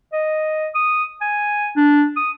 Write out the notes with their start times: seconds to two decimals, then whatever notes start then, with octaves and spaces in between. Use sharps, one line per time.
0.13 D#5
0.75 D#6
1.21 G#5
1.76 D4
2.16 D#6